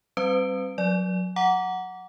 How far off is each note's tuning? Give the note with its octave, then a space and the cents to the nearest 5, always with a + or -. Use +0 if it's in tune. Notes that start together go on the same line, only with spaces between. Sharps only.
G3 +0 C4 +30 B4 +45
F#3 -25 D5 +0
F#5 +0 A#5 +0 D6 -25